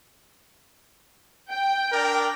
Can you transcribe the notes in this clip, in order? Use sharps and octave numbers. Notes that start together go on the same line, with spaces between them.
G5
D4 A#4 D5